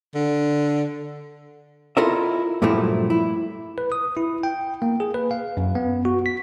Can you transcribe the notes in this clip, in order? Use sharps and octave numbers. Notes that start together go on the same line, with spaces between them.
D3
E4 F4 A4 A#4 D#5 E5
G2 A#2 F3 F#3 A3 E4
E4
B4
D#6
E4
G5
A#3
G#4
B4
F5
F#2
B3
F#4
B6